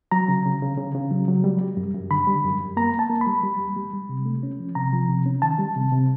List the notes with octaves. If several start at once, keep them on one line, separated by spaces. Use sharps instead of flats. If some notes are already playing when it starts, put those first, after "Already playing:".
F#3 A#5
C#3
C#3
C#3
C#3
C#3
F#3
F#3
G3
G3
F#2
F#2
D3 B5
G3
F#2
F#2
A#3 A#5
A#3 A5
A#3
B5
G3
G3
E2
G3
G3
C3
A3
C#4
F3
C3 A#5
F3
C3
C#4
D#3 A5
G3
C3
C3